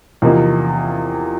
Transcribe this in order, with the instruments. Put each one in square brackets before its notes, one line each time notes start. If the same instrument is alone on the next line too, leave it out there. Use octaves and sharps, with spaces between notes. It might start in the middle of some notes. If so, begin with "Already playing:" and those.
[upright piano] E2 C3 F3 A#3 D#4